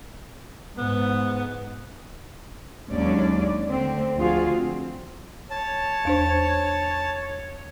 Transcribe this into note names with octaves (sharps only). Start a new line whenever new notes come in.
G#2 B3
D#2 F#3 G#3 C#4 D4 D5
D3 A3 C4
D2 F3 F4 F#4 G#4 F5
C4
C#5 A5
E2 D4 C5